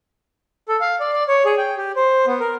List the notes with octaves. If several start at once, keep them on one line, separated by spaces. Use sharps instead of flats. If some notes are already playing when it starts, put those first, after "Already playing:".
A4
F5
D5
D5
C#5
G#4
G5
G4
C5
B3
A#4